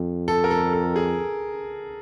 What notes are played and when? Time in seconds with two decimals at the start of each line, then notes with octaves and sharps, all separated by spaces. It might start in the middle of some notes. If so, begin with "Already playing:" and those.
Already playing: F2
0.28 A4
0.44 A#4
0.51 A4
0.73 A4
0.96 G#4